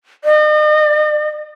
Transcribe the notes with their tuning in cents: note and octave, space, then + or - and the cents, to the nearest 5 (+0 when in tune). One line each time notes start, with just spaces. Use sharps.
D#5 -40